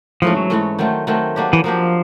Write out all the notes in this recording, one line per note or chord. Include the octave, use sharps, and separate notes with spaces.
G#2 E3 F3 A3 C#4
F#3
G#2 E3 A3 C#4
D#3 F#3 A3 C4
D#3 F#3 A3 C4
F#3 A#3 D4 G4
E3
F3 F#3 A#3 D4 G4